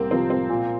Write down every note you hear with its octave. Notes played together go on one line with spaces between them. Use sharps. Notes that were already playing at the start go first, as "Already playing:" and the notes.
Already playing: C2 A#3 C4
C3 F3 C4
C4
A#2